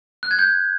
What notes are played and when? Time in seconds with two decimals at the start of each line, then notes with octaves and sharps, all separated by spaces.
0.23 F#6
0.31 G#6
0.39 G6